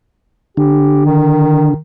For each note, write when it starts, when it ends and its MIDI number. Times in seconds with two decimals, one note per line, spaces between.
0.57 1.74 50
0.57 1.00 67
1.05 1.79 51